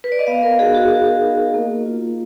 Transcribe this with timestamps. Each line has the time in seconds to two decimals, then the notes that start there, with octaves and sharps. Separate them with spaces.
0.04 B4
0.12 D5
0.19 D#5
0.27 B3 F5
0.43 A#4
0.59 D#4 F#4 G#4
0.75 F#4
0.91 B3
1.22 D#4 F#4
1.54 A#3
1.86 F4